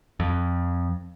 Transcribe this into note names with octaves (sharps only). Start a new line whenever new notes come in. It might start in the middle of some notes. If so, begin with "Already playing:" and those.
F2